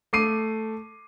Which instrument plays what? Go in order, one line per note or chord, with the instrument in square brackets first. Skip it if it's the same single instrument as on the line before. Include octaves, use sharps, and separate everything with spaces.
[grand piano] A3 D6 C7 D#7